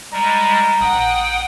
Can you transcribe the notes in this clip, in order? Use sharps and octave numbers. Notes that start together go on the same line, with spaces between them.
G3 G#3 A#5
A#1 F#5 G5 D#6